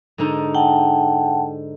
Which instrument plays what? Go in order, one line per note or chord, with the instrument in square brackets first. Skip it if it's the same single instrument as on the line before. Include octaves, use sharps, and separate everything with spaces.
[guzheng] G#2 D3 D#4
[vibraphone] F#5 G5 A5